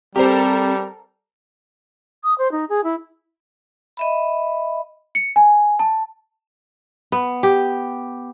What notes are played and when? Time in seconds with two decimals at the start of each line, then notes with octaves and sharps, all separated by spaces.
0.16 G3 C4 G4 A4 A#4 C5
2.24 D#6
2.39 C5
2.52 D#4
2.69 G#4
2.84 E4
3.97 D#5 E5 B5
5.15 C#7
5.36 G#5
5.79 A5
7.12 B3
7.43 G4